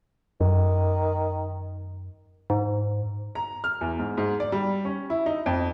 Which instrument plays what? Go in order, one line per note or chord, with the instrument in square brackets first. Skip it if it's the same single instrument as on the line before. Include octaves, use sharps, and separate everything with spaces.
[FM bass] F#2 [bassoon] D#3
[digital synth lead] G#2
[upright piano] A#5
F6
E2
G#2
G#2
D5
G3
C#4
E4
D#4
F2